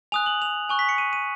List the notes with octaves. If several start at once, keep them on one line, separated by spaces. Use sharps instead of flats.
G#5 D#6 F#6 F7
F#7
F7
G#5 C#6 F#6
B6
C#7
D#7
D#7